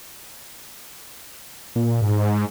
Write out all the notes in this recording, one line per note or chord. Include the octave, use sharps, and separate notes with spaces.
A#2
G#2